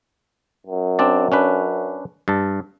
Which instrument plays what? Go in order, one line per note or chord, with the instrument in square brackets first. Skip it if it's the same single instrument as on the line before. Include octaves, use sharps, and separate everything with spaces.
[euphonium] F#2
[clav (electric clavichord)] C4 D4 D5
C#4 D4 B4
G2 A5